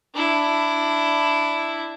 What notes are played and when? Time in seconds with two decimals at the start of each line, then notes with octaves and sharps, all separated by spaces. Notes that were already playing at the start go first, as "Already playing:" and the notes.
0.15 D4 E4